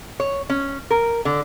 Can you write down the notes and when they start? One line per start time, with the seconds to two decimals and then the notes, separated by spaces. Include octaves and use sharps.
0.20 C#5
0.50 C#4
0.91 A#4
1.25 D3